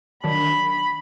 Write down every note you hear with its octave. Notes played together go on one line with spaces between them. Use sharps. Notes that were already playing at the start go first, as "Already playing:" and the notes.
D#3 F#3 D4 B5